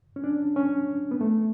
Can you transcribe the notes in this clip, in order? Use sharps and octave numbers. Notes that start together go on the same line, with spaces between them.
C#4
D4
C#4
B3
A3